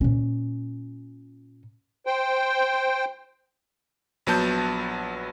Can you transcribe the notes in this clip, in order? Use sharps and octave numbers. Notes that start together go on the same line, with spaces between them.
A#2 C#4
C5 G5
A#1 F#3 B3 A5 G6